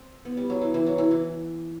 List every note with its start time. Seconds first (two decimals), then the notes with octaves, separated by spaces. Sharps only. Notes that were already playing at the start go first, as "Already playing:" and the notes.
Already playing: C4
0.25 B3
0.37 G3
0.50 F#3
0.61 E3
0.74 E3
0.86 F#3
0.98 E3
1.11 E3